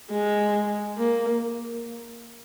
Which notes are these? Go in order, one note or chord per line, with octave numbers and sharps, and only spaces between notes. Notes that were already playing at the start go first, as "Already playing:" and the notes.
G#3
A#3